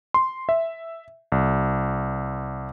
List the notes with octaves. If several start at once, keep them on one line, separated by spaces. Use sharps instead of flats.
C6
E5
C2